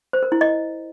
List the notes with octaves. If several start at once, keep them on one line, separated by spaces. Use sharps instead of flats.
C5
A#4
E4
D#5